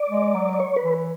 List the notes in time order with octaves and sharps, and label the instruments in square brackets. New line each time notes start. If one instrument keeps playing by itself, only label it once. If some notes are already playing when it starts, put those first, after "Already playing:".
Already playing: [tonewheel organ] D5
[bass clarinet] G#3
F#3
[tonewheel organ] D5
C#5
B4
[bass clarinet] E3